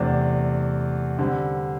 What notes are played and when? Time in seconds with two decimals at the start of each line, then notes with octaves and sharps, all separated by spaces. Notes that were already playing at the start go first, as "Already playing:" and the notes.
Already playing: E2 C3 A3 D4
1.19 D3 G3 C4